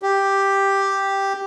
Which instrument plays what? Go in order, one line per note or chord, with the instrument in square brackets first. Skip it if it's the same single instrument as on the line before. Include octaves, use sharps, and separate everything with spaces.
[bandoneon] G4